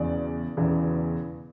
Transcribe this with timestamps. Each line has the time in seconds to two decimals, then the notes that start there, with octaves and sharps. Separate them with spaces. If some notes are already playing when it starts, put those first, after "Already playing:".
Already playing: E1 E2 C#3 E3 D5
0.57 E1 E2 C#3 E3